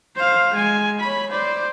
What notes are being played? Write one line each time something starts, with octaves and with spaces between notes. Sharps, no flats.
C5 F5
G#3 G#5
C#5 B5
C5 D5